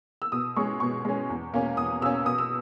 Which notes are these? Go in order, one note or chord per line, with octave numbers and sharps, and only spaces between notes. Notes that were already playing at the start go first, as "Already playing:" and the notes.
E6
B2 D#6
G#3 C#4 C#6
B2 C#6
G#3 C#4
E2
B2 A#3 C#4
E2 D#6
B2 A#3 C#4 E6
B2 D#6
E6